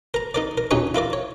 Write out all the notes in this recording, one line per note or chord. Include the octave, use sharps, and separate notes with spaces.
A#4 A#5
D#4 A#4 D5
A#4
A#1 D#2 C#4 D#4 C#5 C#6
E4 F4 A#4 D5
C#5